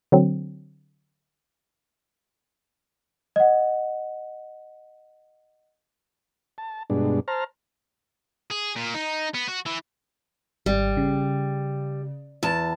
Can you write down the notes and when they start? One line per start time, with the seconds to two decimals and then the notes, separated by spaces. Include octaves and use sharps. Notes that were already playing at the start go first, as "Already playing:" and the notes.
0.12 D3 F#3 C4
3.36 D#5 F#5
6.58 A5
6.90 G2 B2 G#3 D4
7.28 C5 A5 A#5 F6
8.50 G#4
8.76 A#2
8.94 D#4
9.34 B3
9.48 F#4
9.66 E3
10.66 G#1 G3
10.97 C#3
12.43 E2 A5